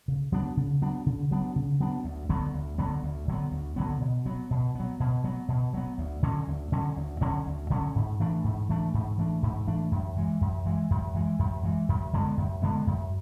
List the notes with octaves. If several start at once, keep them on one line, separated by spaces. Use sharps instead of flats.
C#3
F#3 B3 D4
C#3
F#3 B3 D4
C#3
F#3 B3 D4
C#3
F#3 B3 D4
D2
D3 F#3 B3
D2
D3 F#3 B3
D2
D3 F#3 B3
D2
D3 F#3 B3
B2
F#3 B3
B2
F#3 B3
B2
F#3 B3
B2
F#3 B3
D2
D3 F#3 C#4
D2
D3 F#3 C#4
D2
D3 F#3 C#4
D2
D3 F#3 C#4
G#2
E3 A3 D4
G#2
E3 A3 D4
G#2
E3 A3 D4
G#2
E3 A3 D4
F#2
E3 G#3
F#2
E3 G#3
F#2
E3 G#3
F#2
E3 G#3
F#2
D3 G#3 B3
F#2
D3 G#3 B3
F#2